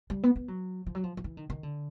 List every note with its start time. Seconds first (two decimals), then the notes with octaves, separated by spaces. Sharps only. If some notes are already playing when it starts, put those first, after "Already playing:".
0.10 G3
0.23 B3
0.36 B3
0.48 F#3
0.87 F3
0.95 F#3
1.04 F3
1.17 F3
1.24 E3
1.37 D#3
1.50 D#3
1.63 D3